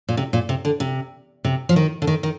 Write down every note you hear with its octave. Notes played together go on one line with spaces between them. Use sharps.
A#2
C3
A#2
C3
D3
C3
C3
F3
D#3
D3
D#3
D#3